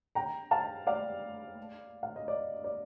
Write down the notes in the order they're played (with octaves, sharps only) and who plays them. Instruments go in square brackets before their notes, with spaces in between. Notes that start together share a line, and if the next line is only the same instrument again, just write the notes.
[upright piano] G5 A#5
F5 A5
D5 F5
F5
D#5
D5
D5